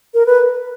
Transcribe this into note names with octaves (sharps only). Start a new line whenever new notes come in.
A#4
B4